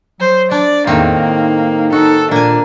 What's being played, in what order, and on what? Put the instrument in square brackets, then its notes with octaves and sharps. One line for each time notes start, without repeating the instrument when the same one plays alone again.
[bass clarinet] F#3 [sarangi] C5
[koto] D4 [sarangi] D5
[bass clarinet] E2 [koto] A2 D#3 C4 [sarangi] A#3
[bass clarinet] D#4
[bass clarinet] D#4 [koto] F#4 [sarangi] A4
[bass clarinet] A#2 [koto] A#3 G#5 [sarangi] D4